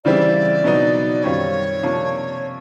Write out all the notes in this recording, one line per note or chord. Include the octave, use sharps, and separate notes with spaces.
C#3 E3 G3 C4 E4 D5
B2 F#3 B3 D#4
F#2 D#3 G3 C4 F4 C#5
C3 F3 A#3 D4